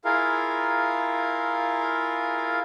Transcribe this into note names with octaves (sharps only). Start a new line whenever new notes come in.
E4 F4 G#4 A#4 F5